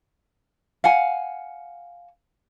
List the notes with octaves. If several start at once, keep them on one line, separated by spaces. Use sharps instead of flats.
F5 F#5 G#5